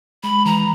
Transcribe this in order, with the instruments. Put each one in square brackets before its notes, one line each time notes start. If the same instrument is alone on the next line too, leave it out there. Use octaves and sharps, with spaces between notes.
[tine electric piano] G#3 [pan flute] B5
[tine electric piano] E3 [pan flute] A#5